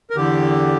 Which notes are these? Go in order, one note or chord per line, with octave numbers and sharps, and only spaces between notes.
A#4
E2 D3 G4